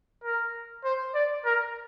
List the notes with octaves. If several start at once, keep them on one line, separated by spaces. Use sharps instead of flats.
A#4
C5
D5
A#4